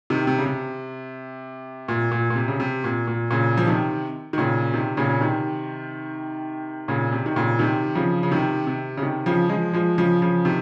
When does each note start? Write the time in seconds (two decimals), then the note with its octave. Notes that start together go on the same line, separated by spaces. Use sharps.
0.10 C3 D#3
0.27 C3
0.38 C#3
0.46 C3
1.88 A#2
2.12 A#2
2.30 A#2
2.36 C3
2.48 C#3
2.60 C3
2.84 A#2
3.07 A#2
3.31 A#2 C#3
3.57 F3
3.67 C3 D#3
4.33 D#3
4.38 A#2 C#3
4.74 C3 D#3
4.97 A#2 C#3
5.09 C#3
5.21 C3 D#3
6.88 A#2 C#3
7.12 C3
7.26 D#3
7.36 A#2 C#3
7.59 C3 D#3
7.95 C#3 F3
8.23 C#3
8.32 C3 D#3
8.67 C3
8.97 C#3
9.02 C3 D#3
9.26 C#3 F3
9.49 F3 G#3
9.73 F3 G#3
9.98 C#3 F3
10.22 C#3 F3
10.45 C3 D#3